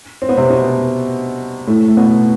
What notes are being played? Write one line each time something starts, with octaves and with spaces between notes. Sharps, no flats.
C4
B3
C3 C4
B2 B3
A2 A3
A3
B2 B3